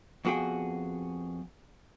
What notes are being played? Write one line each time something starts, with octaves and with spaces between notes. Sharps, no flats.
F2 B3 F#4 G#4 G5